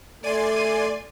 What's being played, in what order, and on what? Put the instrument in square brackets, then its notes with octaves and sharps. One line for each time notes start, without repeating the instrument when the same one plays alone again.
[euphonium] A3 [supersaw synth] D5 G#5 C6 [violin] D#7